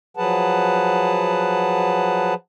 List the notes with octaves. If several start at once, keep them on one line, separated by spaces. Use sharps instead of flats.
F3 F#3 G#4 B4 F#5 A5